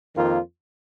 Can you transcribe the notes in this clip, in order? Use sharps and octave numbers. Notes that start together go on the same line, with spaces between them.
F2 D#3 A#3 F4